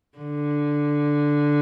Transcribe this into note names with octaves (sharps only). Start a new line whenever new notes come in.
D3